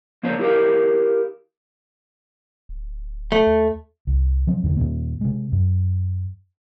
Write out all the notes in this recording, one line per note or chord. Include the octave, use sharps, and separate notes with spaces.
F3 A#3 D4 C5 C#5
E4 G4 A4 A#4 F5
D1
A3
D#2
C2
F3 F#3 C4
E2 D3 D#3
D#2 A#2 D#3 A#3
C3 G#3
F#2